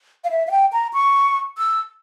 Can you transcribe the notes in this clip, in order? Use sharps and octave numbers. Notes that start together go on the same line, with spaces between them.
F5
E5
F5
G5
A#5
C#6
E6